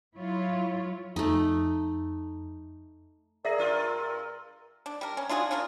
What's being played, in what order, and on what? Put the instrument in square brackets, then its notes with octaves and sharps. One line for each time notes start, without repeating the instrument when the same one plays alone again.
[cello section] F#3 E4 F4 C#5
[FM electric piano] F2 [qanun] A3 D#4
[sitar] G#4 [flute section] A#4 A#5 E6 [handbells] D5 E5 A#6
[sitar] G2 F4 [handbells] D5
[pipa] D4
G3 A#4
C#4
D4 F4 F#4 G#4
C#4 D4 F4 A#4